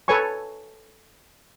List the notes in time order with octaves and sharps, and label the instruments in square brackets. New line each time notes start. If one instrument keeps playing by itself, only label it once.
[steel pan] A4 B4 C#5 G#5 C#6